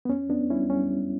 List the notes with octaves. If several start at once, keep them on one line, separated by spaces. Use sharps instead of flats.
B3
E2 C#4
E2 B3 D4
G3 C#4 E4
G3 C#4
G3